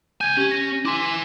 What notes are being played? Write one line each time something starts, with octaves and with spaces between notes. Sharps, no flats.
C#2 G#5 G6 G#6 D#7
C#4 G4 G#6
A#6
E4 G#5 C6 D6